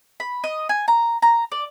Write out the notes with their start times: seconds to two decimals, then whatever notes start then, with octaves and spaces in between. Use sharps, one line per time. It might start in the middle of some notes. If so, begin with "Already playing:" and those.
0.20 B5
0.44 D#5
0.69 G#5
0.88 A#5
1.22 A#5
1.52 D5